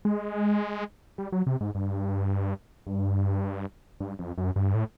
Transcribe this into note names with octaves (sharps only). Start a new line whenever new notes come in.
G#3
G3
F#3
C3
G#2
G2
G2
G2
F2
F#2
G2
A2